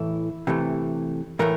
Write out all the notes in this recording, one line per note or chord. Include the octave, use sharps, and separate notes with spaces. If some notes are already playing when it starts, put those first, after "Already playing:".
Already playing: A2 E3 A3 E4
C3 E3 A3
A2 E3 A3 A#4